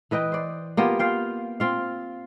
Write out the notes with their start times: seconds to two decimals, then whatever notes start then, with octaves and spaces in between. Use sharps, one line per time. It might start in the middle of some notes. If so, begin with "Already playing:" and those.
0.11 E3 B4 D#5 G5
0.32 C5 D5
0.77 A#3 B3 F4 G4
0.99 F4 F5 G5
1.60 C4 F4 F5